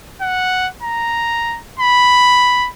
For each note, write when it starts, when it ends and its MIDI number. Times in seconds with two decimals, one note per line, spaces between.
0.21 0.68 78
0.82 1.59 82
1.79 2.69 83